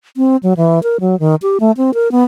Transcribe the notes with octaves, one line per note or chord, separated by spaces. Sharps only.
C4
F#3
E3
A#4
F#3
D#3
G4
A3
C4
A#4
B3